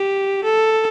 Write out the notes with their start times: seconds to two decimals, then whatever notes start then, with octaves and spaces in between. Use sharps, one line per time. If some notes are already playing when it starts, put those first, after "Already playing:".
Already playing: G4
0.44 A4